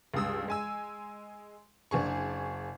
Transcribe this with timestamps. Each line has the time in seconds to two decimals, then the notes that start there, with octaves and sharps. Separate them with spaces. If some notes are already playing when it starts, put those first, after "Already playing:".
0.14 C#2 G2 D#6 E6
0.48 G#3 G#5 E6
1.91 F#1 D4 G#4 C#6